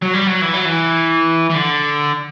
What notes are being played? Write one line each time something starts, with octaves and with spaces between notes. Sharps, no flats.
F#3
G3
F#3
E3
F#3
E3
E3
D3